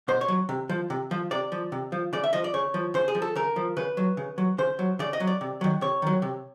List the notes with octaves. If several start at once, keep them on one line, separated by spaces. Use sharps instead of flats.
B2 C5
C#5
F#3
C3
F3
C3
F3
C3 D5
F3
C3
F3
C#3 D5
E5
F3 D#5
D5
C#3 C#5
F3
C#3 C5
G#4
F3
A4
C#3 A#4
F3
C#3 B4
F#3
C#3
F#3
C#3 C5
F#3
C#3 D5
D#5
F#3
D5
C3
D#3 F#3
C3 C#5
D#3 F#3
C3